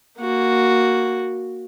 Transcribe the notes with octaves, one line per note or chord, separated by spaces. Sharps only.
A#3 F#4